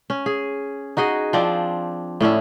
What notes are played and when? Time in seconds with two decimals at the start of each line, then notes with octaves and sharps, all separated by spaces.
0.10 C#4
0.26 G#4
0.97 D#4 F#4 G#4 D#5
1.33 F3 C4 D4 D5
2.21 A2 C#4 D4 E4